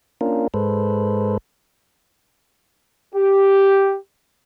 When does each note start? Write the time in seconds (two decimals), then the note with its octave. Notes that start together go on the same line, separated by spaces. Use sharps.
0.21 A#3 C#4 D4 F4 A#4
0.54 G#2 G#3 A4 B4 C5
3.15 G4